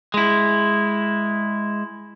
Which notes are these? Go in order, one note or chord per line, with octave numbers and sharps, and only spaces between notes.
G#3 E4